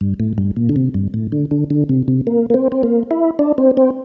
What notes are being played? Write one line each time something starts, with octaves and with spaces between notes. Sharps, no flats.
G2
A2
G2
A#2
D3
C3
G2
A2
D3
D3
D3
C3
C3
A#3
A#3
C4
C4
A#3
E4
D4
C4
C4